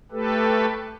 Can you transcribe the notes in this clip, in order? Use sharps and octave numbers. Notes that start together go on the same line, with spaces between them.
A3 G4 A4 B4